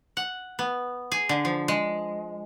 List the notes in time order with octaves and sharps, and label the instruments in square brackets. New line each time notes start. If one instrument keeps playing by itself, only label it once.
[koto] F#5
B3
G#4
D3
F3
G#3